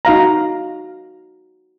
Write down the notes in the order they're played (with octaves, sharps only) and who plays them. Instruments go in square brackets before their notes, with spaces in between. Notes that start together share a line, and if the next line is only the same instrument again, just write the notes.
[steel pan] D#4 F#4 F5 A#5